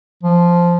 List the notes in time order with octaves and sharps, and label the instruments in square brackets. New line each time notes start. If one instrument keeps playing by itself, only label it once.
[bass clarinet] F3